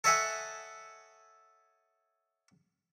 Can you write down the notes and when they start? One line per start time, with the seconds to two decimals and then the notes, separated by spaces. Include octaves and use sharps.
0.04 A4 C#5 D#5 E5 F#5 G#5